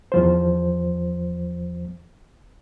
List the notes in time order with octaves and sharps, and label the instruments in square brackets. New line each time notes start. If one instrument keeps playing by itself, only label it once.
[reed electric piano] E2 F3 C5